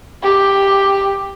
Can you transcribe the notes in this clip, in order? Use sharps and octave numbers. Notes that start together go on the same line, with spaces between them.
G4